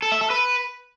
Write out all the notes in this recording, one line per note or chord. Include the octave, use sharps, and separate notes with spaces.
A4
E5
A4
B4